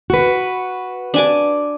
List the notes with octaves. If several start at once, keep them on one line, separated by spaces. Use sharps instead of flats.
F#4 B4
D4 G#5 D6